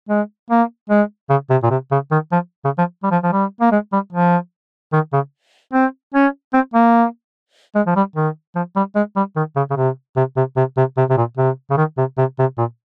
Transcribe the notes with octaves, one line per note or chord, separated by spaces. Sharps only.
G#3
A#3
G#3
C#3
C3
A#2
C3
C#3
D#3
F3
C#3
F3
G3
F3
F3
G3
A#3
G#3
G3
F3
D#3
C#3
C4
C#4
C4
A#3
G#3
F3
G3
D#3
F3
G3
G#3
G3
D#3
C#3
C#3
C3
C3
C3
C3
C3
C3
C3
A#2
C3
C#3
D#3
C3
C3
C3
A#2